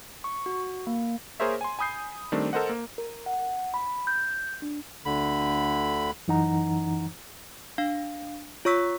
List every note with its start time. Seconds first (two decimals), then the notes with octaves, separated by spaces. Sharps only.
0.24 C#6
0.46 F#4
0.87 A#3
1.40 A#3 G#4 A#4 C5 C#5 E5
1.61 G#5 C6
1.79 G#5 B5 D#6 G6 C7
2.32 D#3 G3 A3 C4 D4
2.53 A4 A#4 C5 D#5 F#5
2.69 A#3
2.98 A#4
3.26 F#5
3.74 B5
4.07 G6
4.62 D4
5.05 D2 D3 B5
6.28 F#2 E3 D#4 F#5 A#5
7.78 D4 F5
8.65 F4 C#5 C#6 E6 B6